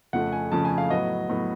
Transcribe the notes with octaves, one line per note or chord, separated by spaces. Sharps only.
F2 C#3 F3 A3 F#5
G#5
F2 C#3 F3 A3 A5
G#5
F5
A2 F#3 B3 D#5
A2 F#3 B3